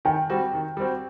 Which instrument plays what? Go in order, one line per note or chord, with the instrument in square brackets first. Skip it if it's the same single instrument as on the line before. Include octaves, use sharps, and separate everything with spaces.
[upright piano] D#3 [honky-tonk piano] G5
[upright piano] G3 C4 F#4
D#3
G3 C4 F#4